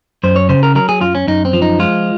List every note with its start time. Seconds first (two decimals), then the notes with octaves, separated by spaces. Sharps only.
0.23 F#2 C5
0.36 C#5
0.49 C#3 C5
0.63 A#4
0.75 F#3 A#4
0.89 G#4
1.01 F#2 F4
1.15 C#4
1.27 F#2 D#4
1.45 C4
1.53 F3
1.62 D#4
1.79 G#3 F4